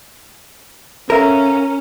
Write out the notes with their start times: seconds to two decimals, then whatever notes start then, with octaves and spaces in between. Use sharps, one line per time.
1.10 C#4 A4 A#4 E5 F5